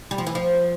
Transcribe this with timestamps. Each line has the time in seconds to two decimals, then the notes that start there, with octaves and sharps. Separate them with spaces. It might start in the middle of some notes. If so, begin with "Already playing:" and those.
0.11 G3
0.18 F3
0.26 E3
0.35 F3